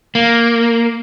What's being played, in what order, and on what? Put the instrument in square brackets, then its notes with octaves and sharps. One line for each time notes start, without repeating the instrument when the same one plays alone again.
[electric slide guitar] A#3